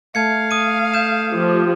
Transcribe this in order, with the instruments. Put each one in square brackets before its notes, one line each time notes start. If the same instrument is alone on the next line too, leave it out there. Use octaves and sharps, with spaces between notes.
[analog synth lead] A3 [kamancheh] F5 [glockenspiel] A5 G#6 C#7
[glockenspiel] D#6 D#7
G6 E7
[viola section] F3 G4